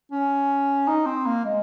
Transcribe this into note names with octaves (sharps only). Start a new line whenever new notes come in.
C#4
D#4
C4
A#3
G#3